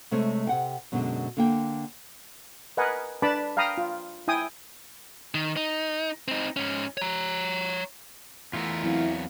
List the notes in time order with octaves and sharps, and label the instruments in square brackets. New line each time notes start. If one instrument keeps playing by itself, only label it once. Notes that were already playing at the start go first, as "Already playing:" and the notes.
[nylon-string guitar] C3 G#3 A3 C#5
C3 F#5 G5
F#2 B2 D3 E3 F#3 G#3
D3 A#3 G5
[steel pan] A#4 B4 D#5 F#5 G#5
D4 B4 A5 B5 D6
F5 G5 A#5 B5 D#6
F4
E4 G5 G#5 D#6
[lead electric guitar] D#3
D#4
C4 D#4
G#2 C#4
C#5 A#5
[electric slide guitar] E2 B3 A#4 [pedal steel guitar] E3 A3 F4
[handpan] F#3 C4 F5 [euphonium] E4